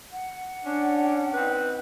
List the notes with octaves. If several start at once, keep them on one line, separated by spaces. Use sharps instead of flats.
F#5
C#4 D4
C4 D#4 B4